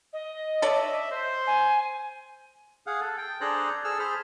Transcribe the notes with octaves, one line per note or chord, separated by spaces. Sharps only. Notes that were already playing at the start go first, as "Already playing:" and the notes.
D#5
A4 C#5 D5 E5
C5
G#5
G#4 F5 F#5
A4
G5
D4 G#4 A4 C5 A#5 F#6
G#4 A4 E6 F6
G#4 C5 B5 F6